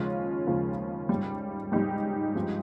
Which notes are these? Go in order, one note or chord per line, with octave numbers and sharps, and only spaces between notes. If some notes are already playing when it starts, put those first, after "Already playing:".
Already playing: D#2 C#3 F3 G#3 C#4 F4
D#2 C#3 F3 G#3
G#2 G3
G#2 G3 D#4 G4
G2 F3 G#3